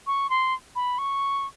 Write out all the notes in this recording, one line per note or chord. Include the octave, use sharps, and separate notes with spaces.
C#6
C6
B5
C#6